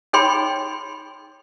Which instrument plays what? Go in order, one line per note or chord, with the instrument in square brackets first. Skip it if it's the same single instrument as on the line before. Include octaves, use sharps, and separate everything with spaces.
[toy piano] D#4 G#4 C#5 G5 B5 C6